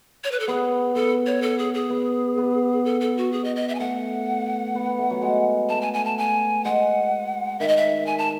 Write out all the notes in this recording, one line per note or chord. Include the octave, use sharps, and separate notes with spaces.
C#5
B4
A4
B3 G#4
B3 A4
C#5
A4
G#4
G#4
B3
B3
A4
A4
F#4
G#4
D#5
D#5
E5
G#5
A3 F#5
B3
B3
A3
F#3
G#3
A3 A5
G#5
G#5
A5
G#5
G#3 F#5
D#3 E5
D#5
E5
G#5
A5